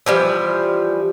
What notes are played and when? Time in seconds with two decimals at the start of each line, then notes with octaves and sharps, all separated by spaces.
0.06 E3 F3 G3